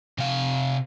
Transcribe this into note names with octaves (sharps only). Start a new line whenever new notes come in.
C3 F5